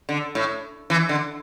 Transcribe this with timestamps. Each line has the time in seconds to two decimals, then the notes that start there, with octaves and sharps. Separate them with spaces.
0.09 D3
0.35 A2
0.90 E3
1.09 D3